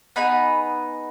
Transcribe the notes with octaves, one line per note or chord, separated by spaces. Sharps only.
B3 D#4 G#4 G#5 B5